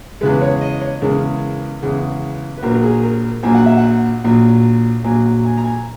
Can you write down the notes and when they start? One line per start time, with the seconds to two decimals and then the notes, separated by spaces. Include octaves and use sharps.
0.21 E2 C#3 G#3 B4
0.41 C#5
0.61 D#5
0.81 C#5
1.01 E2 C#3 G#3 A#4
1.82 E2 C#3 G#3
2.57 B4
2.62 A#1 A#2 F#3 A#4
2.74 A#4
2.83 G#4
3.03 A#4
3.43 A#1 A#2 F#3 G#5
3.55 F#5
3.66 E5
3.78 F#5
4.24 A#1 A#2 F#3
5.04 A#1 A#2 F#3 G#5
5.45 G#5
5.57 A#5
5.64 G#5